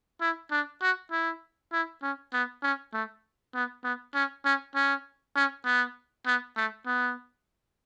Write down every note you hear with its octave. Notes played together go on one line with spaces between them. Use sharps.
E4
D4
F#4
E4
E4
C#4
B3
C#4
A3
B3
B3
C#4
C#4
C#4
C#4
B3
B3
A3
B3